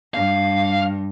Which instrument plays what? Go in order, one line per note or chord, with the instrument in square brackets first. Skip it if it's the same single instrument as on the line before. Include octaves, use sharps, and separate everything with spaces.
[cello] G2 [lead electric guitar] F5